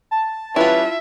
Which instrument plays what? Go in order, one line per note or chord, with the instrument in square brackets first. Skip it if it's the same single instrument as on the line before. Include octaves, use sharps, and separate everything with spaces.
[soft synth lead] A5
[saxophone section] G3 C#4 B4 [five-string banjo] E4 F4 [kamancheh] E5